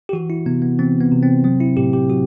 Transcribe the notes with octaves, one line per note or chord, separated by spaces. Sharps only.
G4
E3 F#4
E4
C3 B3
B3
E3 C4
B3
C3
C4
F#3 C4
E4
A2 G4
G4
F#3 F#4